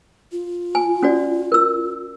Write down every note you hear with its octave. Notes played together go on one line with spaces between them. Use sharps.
F4
G#5
C#4 F#4 D5
A#4 E6